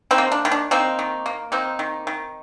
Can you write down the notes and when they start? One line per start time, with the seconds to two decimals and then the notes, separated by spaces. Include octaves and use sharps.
0.11 C4 D#4
0.18 A#3
0.32 D4
0.45 D#3
0.52 D4
0.71 A#3 C4 D#4
0.99 D#3
1.26 A#3
1.52 A#3 C4 D#4
1.79 D#3
2.07 D#3